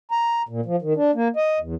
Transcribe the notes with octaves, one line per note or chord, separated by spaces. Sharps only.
A#5
A#2
F3
D#3
D4
A#3
D#5
E2